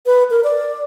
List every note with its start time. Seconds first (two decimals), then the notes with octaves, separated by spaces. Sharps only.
0.06 B4
0.30 A#4
0.44 D5